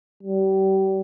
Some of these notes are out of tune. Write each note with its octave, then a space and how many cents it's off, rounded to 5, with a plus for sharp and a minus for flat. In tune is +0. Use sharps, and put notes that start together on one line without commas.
G3 -35